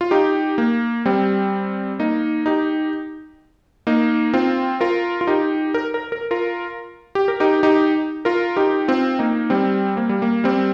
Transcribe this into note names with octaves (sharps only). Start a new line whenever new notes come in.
F4
D#4 G4
A#3
G3 C4
A#3 D#4
D#4 G4
A#3 D#4
C4 F4
F4 A#4
F4
D#4 G4
A#4
A#4
A#4
F4 A#4
G4
A#4
D#4 G4
D#4 G4
F4 A#4
D#4 G4
C4 F4
A#3 D#4
G3 C4
A#3
G3
A#3
G3 C4